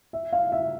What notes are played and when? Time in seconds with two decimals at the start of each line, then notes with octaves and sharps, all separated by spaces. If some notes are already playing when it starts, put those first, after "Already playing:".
0.13 E5
0.33 F5
0.52 E5